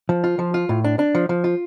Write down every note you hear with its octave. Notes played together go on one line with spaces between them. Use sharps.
F3
F4
F3
F4
A2
D4
D4
F3
F3
F4